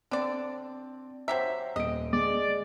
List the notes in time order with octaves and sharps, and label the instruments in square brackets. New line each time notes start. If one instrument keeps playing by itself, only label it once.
[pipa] D3 D5 [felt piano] C4
[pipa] F#3 G4 E5 [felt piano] C5 A#5
[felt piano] D#1 D7 [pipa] D#5
[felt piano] G#3 [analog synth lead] D5